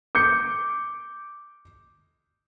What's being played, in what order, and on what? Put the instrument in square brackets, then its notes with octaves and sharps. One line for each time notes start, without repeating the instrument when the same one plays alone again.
[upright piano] D6 G6 C#7